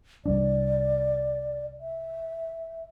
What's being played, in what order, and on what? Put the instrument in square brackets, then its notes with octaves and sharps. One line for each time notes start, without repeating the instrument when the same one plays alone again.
[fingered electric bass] C2 G3 D4 [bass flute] D5
[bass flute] E5